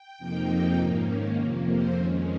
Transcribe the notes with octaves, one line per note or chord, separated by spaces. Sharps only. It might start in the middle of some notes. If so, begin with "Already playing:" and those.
Already playing: G5
F2 C3 F3 A#3 D#4
G#2 D#3 A#3 C#4
F2 C3 F3 A#3 C#5
C5
F2 D#3 G#3 C#4 C#5